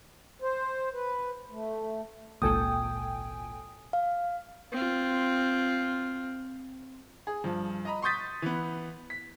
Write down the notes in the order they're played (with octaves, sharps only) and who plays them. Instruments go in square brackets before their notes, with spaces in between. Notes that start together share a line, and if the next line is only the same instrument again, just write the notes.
[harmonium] C5
B4
A3
[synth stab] G#1 C#2 A4 [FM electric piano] A#2 G5 G#5 [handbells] D#6
[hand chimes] F5
[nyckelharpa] C4 F4
[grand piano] G#4
G2 F3
D#5 A#5 B5
C6 C#6 D#6 G6 A6 B6
E3 B3
B6